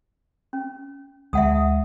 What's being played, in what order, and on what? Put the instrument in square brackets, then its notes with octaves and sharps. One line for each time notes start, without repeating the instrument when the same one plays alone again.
[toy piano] C#4
[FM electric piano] D2 G#3 [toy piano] E5 F#5 D#6